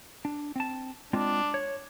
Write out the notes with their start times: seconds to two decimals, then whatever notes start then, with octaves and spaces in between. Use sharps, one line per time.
0.25 D4
0.56 C4 A5
1.13 G#3 C4 D4 F4
1.54 C#5